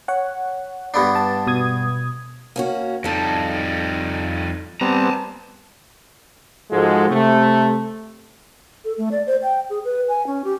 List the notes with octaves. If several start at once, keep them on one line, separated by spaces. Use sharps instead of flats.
C#5 F#5
G2 B3 D4
A5
B2 D#6 G#6
A#3 C#4 F#4
F2 G3 D#4 A4
G3 B3 C4 A5 A#5
G#2 F3 G#3 F#4 A4
C3 A3
A4
A3
D5
C5
G5
G#4
B4
G#5
C#4
G4